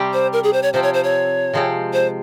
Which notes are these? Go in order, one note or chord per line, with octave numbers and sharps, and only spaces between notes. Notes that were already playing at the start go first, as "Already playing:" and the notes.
Already playing: C3 G3 C4 G4
C5
A#4
G#4
C5
C#5
C3 F3 C4 C5
C#5
C5
C#5
C3 F3 G#3 C4
C5